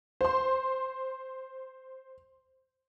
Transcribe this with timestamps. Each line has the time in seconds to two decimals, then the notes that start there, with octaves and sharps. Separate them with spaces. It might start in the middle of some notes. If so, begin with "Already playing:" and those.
0.21 C5 C6